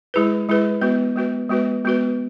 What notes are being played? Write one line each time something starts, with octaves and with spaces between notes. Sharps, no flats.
G#3 E4 G#4 B4
G#3 E4 G#4 B4
G#3 B3 F#4 B4
G#3 B3 F#4 B4
G#3 B3 F#4 B4
G#3 B3 F#4 B4